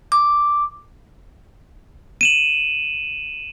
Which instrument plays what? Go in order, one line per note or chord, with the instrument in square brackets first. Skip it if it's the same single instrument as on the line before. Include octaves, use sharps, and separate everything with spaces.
[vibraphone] D6
[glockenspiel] D#7 E7 F#7